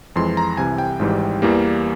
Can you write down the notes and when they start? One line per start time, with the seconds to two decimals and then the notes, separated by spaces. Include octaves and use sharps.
0.16 F2 E3 G#3 C6
0.37 A#5
0.57 C2 C3 E3 G#5
0.78 G5
0.99 G#1 G#2 E3 G3
1.42 E2 E3 G3 A#3